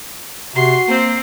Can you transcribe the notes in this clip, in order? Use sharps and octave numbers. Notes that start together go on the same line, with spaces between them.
C3 F#4 C6 C7
A#3 C4 C5